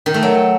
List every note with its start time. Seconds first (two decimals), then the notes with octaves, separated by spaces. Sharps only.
0.06 D#3
0.14 A3
0.23 F#3